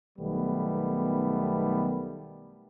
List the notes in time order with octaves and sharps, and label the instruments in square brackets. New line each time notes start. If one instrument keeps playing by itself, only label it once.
[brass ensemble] B1 D#3 G3 A3 B3